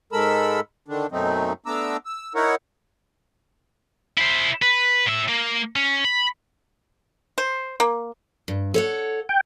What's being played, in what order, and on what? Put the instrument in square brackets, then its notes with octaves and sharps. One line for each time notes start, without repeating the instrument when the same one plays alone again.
[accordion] G#2 G#3 A4 A#4 B5 E6
D3 D#3 D4
F#2 B2 F#3 A3 C4 D#4
A3 B3 D4 A#5 D6 E6
E6
D#4 E4 A#4 C#5 F#5
[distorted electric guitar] E4 C5
B4
A2 E5
A#3
C#4
B5
[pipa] C5
A#3
[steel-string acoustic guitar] G2
A4 C#5 F#5
[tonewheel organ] G5